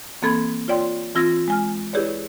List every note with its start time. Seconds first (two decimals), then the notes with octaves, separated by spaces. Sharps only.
0.22 E3 A#3 C4 A4 B5 G#6
0.68 F4 C#5 D5 G5 C6
1.15 E3 C4 F4 E6 G#6 A#6
1.48 G#3 G#5 F6
1.93 E4 G4 G#4 B4 C#5 D5